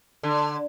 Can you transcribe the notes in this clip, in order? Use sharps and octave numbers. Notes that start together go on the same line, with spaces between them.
D3